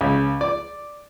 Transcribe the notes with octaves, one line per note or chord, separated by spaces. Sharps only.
C#2
D5